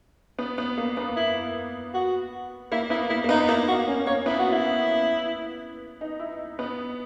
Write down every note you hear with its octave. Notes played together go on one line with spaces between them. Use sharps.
B3
B3
A#3
B3
E4
F#4
A#3 E4
B3 E4
A#3 E4
A#3
B3 D#4
D#4
A#3 E4
F#4
C#4
A#3 C#5
B3 E4
F#4
E4
D#4
E4
B3